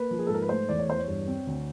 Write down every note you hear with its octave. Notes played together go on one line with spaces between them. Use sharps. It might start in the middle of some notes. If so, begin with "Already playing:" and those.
Already playing: A#3 B4
F3
G#4
A4
G#2 A#4
B4
A3 C5
E2 D5
C#5
E2 C5
C#5
G2
C4
D2